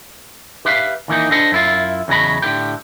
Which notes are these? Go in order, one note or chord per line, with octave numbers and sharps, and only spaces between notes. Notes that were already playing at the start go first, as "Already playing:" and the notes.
G4 B4 E5 F5
D#2 E3 A#3 D#4
D4 A4 C5 D#5 F#5
F#2 E4 F4
E2 C#3 F#3 D#5 B5
A2 D3 A#3 G4